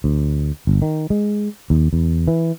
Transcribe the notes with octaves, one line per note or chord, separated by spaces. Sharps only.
D2
G1
D#3
G#3
D#2
E2
E3